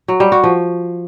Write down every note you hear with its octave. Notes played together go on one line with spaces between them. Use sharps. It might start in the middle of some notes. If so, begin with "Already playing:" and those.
F#3
G3
F#4
F3